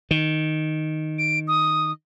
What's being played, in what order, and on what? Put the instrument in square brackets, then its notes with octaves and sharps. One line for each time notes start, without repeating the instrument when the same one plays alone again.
[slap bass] D#3
[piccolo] D7
D#6